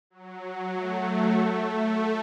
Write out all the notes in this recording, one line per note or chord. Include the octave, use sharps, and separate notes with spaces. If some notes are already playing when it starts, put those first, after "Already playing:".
F#3
A3
A3
A3